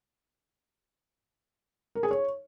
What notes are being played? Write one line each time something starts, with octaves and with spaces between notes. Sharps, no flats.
A#4
G#4
C#5